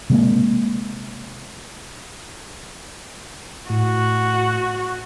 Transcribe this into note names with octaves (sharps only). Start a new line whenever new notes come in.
C3 G#3 A#3
A2 F#4